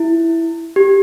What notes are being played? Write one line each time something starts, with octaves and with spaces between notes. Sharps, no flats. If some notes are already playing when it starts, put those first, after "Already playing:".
Already playing: E4
G4